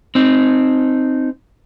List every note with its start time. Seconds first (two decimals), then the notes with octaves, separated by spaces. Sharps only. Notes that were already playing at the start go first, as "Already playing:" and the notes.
0.15 C4 D#4